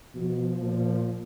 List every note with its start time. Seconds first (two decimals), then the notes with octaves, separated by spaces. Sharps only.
0.15 B2 F3
0.62 A#2